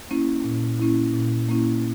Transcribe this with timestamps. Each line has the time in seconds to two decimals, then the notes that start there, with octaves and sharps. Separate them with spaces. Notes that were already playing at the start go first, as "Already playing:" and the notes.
0.11 A#3 C#4 E4
0.44 A#2
0.80 A#3 C#4 E4
1.14 A#2
1.49 A#3 C#4 E4